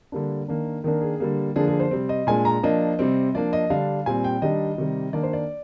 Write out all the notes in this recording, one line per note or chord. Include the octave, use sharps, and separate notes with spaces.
D3 G3 A#3 D4
D#3 A#3 D4
D#3 A#3 D4 A#4
G#4
D3 G3 A#3
D3 F3 A#3 D4 G#4
G#4
C5
C3 G3 C4
D#5
A#2 G#3 D4 G#5
A#5
F3 A#3 D4 D#5
C3 G3 C4
F3 A#3 D4 D5
D#5
D3 G3 D4 F5
A#2 G3 C4 G#5
G5
D#3 G3 D4 D#5
C3 D#3 G3
D#3 A#3 D4 D5
C5
D5